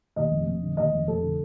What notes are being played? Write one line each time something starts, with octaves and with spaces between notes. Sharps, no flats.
D#2 D#5
F1
F1
D3
D#2 D#5
F1
F1 A4
D3